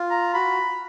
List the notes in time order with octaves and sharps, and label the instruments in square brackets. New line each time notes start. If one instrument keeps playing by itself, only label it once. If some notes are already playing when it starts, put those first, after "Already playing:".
Already playing: [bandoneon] F4
[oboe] A#5
[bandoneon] F#4 [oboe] B5